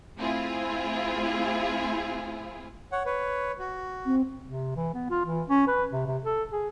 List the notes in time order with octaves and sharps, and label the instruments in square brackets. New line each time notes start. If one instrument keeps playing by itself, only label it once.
[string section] A3 C4 E4 F4 G#4
[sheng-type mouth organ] C#5 F#5
B4 C#5
F#4
[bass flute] C4
[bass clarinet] C3
E3
B3
F4
E3
C#4
B4
C3
C3
A4
G#4